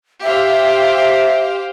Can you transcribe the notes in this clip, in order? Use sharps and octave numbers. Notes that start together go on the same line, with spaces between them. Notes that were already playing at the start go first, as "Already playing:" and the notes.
G4 C5 E5 F5